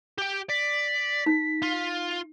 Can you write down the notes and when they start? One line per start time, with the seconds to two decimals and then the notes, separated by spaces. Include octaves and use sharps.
0.18 G4 G5
0.50 D5 B6
1.26 D#4
1.62 F4